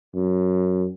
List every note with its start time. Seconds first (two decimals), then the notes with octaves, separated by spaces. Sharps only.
0.15 F#2